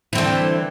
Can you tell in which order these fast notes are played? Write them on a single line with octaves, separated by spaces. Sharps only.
E3 C4 D3